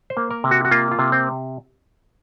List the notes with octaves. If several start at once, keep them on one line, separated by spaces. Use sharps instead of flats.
C5
A#3
A#4
C3
F#4
F#4
A#3 F4
F4
C3
C4